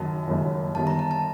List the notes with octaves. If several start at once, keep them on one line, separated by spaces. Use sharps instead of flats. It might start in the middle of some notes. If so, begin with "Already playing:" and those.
Already playing: F#1 F#2 D#3 F#3 A5
F#1 F#2 D#3 F#3
G1 G2 D#3 G3 A5
A#5
A5
A5